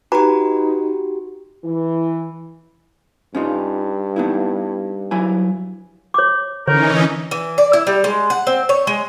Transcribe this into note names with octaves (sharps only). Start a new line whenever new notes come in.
D#4 F#4 G4 B4 A#5
E3
G2 C#4 D#4 F4
B3 D#4 E4
F#3 E4 G#5
C#5 D6
D3 E3 C#4 D#4 A#4 C#5
E3
D5
E4
G3
G#3
F#5
C4
C#5
G#3